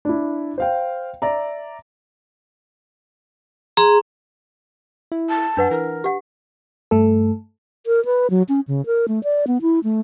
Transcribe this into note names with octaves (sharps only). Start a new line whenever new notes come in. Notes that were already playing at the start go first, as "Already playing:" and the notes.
D4 E4
C5 F5 G5
D5 E5 A#5
G#4 A#5 C6
E4
A5
F#2 D4 B4 F#5
E3 A#4
G4 F#5
G2 A3 A4
A#4
B4
F#3
C#4
C#3
A#4
A3
D5
B3
E4
A3